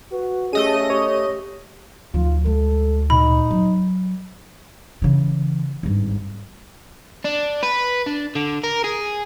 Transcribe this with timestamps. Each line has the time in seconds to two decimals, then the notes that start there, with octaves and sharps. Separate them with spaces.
0.12 F#4 B4
0.53 A3 C#4 G4 G#4 D#5 D#7
0.90 G4 C#5
2.14 D2 F3 D#4 F4
2.45 G#3 A4
3.10 A#2 D#4 B5
3.51 F#3
5.02 C#3 E3
5.83 G#1 G2
7.24 D4
7.63 B4
8.06 D4
8.35 D3
8.64 A#4
8.84 G#4